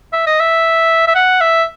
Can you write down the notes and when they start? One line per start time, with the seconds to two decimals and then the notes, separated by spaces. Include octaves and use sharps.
0.13 E5
0.26 D#5
0.40 E5
1.08 E5
1.15 F#5
1.41 E5